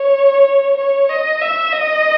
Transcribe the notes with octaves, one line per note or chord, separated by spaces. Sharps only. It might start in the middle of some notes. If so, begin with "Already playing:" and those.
Already playing: C#5
C#5
D#5
E5
D#5